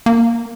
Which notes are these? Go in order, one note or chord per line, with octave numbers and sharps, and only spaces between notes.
A#3